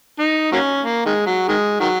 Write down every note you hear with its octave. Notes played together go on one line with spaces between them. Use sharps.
D#4
F#3 A#3 C#4
A#3
D#3 G#3
F#3
D#3 G#3
D#3 F#3